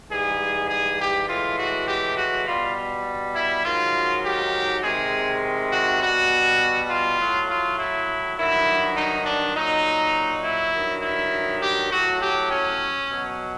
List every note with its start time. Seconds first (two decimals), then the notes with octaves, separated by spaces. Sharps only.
0.10 G#2 E3 G3 G#4
0.70 G#4
1.00 G4
1.29 A2 E3 G#3 F4
1.59 F#4
1.87 G4
2.17 F#4
2.47 B2 G3 F4
3.35 E4
3.64 G#2 D#3 F#3 F4
4.24 G4
4.83 C3 D#3 G#3 G#4
5.71 F#4
6.01 B2 G3 F#4
6.90 F4
7.19 A2 F#3
7.49 F4
7.79 E4
8.37 G2 D#3 F#3 E4
8.97 D#4
9.25 D4
9.55 A#2 F#3 D#4
10.43 E4
10.74 G2 D#3 F#3
11.02 E4
11.62 G4
11.92 A2 F#3 F#4
12.20 G4
12.51 C#4
13.09 B2 F#3